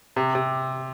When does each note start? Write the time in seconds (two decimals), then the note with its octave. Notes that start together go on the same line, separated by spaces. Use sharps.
0.16 C3
0.35 C3